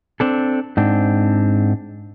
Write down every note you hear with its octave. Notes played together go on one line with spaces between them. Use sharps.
C4 D4 A4
G#2 C4 D4